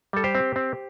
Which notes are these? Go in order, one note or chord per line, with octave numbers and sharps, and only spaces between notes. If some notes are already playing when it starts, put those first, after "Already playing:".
G3 A4
G4 C5
C4
C4